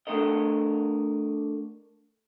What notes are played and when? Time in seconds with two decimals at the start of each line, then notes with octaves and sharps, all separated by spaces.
0.07 A3 D4 A4 A#4 D#5